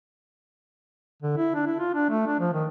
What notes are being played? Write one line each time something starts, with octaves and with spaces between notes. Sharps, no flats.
D3
E4
D4
E4
F4
D4
A3
D4
F3
D#3